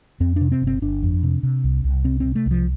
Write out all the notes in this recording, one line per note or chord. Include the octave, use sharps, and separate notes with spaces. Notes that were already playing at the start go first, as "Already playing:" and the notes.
F2 C4
C3 D4
C4
G1
C4
G1 D4
F2
C3
C3
C2
C2
C3 C4
C3 C4
A3
C2
F3